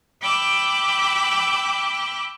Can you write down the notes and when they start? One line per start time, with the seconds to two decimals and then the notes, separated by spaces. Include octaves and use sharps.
0.21 G5 B5 D6 E6 F#6